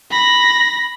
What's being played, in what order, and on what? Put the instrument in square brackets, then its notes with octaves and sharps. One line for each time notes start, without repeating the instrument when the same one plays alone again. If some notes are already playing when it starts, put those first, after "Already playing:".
[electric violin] B5 A#6